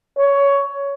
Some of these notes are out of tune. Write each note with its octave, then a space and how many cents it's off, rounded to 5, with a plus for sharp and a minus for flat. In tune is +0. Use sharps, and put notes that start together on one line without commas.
C#5 +15